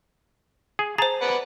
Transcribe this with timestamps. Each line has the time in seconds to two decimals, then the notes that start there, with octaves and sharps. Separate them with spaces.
0.79 G#4
0.98 G#4 C5 A5 A#5
1.22 B4 D5 F#5